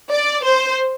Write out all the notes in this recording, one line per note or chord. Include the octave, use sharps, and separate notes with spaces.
D5
C5